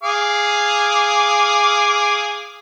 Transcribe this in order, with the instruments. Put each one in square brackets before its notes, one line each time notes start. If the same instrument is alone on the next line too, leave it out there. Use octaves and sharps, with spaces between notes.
[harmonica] G#4 F5 D6